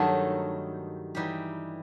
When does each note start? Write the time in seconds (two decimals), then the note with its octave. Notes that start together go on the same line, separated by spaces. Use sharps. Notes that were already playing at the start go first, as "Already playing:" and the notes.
Already playing: G2 D#3 F#3 A3 D#4
1.15 E3 G3 D#4 G4